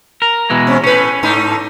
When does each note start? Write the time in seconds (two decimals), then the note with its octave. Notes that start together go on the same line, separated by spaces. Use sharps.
0.22 A#4
0.50 B2 E3 G#3
0.67 C4 C#4
0.84 A2 C#4 B4
1.23 G#2 A3 D#4